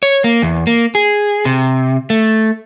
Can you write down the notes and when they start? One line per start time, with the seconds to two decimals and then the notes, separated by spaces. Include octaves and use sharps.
0.03 C#5
0.24 A#3
0.42 E2
0.67 A#3
0.95 G#4
1.45 C3
2.10 A3